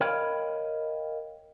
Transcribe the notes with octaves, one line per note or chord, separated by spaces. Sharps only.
A#4 C#5 D#5 F5 G5 B5